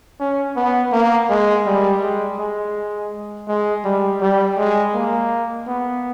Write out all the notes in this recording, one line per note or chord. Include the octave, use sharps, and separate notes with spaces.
C#4
B3
A#3
G#3
G3
G#3
G#3
G#3
G3
G3
G#3
A#3
B3